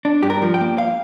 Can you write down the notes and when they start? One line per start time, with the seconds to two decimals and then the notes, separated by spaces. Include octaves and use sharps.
0.05 D4
0.23 G2 G4
0.30 A#4
0.42 F3
0.54 G5
0.61 A#3
0.78 F5